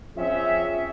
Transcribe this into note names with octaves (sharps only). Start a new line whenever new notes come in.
F3 C4 C#4 G#4 E5